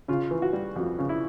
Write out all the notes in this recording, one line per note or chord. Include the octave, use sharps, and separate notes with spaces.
C#3 F4
E3
F#4
G3
F2 F#4
C#3
E4